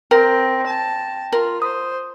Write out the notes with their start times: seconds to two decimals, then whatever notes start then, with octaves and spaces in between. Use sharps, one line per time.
0.11 C4 A#4 G5 A#6
0.67 A5
1.32 F4 A#4
1.62 C5 D#6